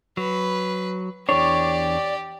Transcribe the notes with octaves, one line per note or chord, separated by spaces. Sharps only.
F#3 B4
E2 D4 G4 C#5 D5